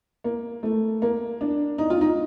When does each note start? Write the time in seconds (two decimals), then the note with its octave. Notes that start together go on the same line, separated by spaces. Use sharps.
0.24 A#3
0.63 A3
1.02 A#3
1.41 D4
1.78 D#4
1.90 F4
2.01 D#4